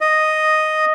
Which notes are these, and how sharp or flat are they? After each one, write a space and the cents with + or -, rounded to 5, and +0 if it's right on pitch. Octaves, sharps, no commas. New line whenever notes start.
D#5 +0